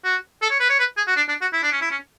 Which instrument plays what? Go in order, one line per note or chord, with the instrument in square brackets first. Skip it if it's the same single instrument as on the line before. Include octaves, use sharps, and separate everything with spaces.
[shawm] F#4
A4
C#5
B4
C#5
B4
G#4
F#4
D4
D4
F#4
E4
D4
C#4
E4
C#4